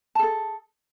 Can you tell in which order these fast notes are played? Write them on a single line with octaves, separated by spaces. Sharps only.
A5 G#4 A4